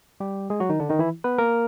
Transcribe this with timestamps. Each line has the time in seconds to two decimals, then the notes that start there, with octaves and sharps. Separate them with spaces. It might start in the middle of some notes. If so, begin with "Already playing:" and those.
0.20 G3 G4
0.50 G#3 G#4
0.60 F#3 F#4
0.69 D#3 D#4
0.80 D3 D4
0.89 D#3 D#4
0.99 E3 E4
1.24 B3 B4
1.38 A#3 A#4